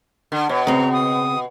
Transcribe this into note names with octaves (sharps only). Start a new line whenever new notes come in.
D3
B2 C#5
C#3 C4 A#5
D#6